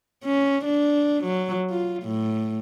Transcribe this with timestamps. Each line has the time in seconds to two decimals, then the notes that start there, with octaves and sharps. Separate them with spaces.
0.24 C#4
0.65 D4
1.24 F#3
1.70 F4
2.03 A2